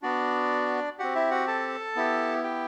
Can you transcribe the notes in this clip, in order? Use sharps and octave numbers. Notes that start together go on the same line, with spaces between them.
B3 D4 F#4 D5
C4 F#4 G4 F#5
E4 E5
F#4 F#5
A4 A5
B3 E4 G4
G4 G5